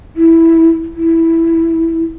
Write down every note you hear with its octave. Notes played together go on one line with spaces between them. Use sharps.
E4
E4